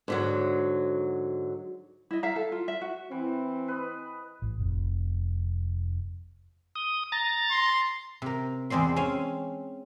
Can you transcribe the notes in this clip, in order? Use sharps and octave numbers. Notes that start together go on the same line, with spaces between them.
G#2 D3 F#3
E4 D#5
E5 F5 A#5
A4
F4
E5
F#4
E3 C4
B4 D#5
A1
F1
D#6
A#5 A6
C6
C3 A#4
E2 G#3 C4 D5 C6
C4 C#4 F5 G#5